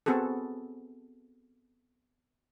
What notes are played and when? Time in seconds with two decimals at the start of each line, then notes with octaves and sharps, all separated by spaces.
0.06 B3 C4 F#4 G#4 A4